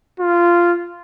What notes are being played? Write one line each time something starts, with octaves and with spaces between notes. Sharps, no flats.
F4